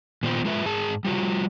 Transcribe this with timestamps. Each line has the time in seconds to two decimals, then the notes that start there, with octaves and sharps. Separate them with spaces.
0.23 A#2 D#3 B3 F4 C5 G5
0.45 G#3 F4 B4 E5
0.66 G#2 G#4 A5
1.05 G3 F4 F#4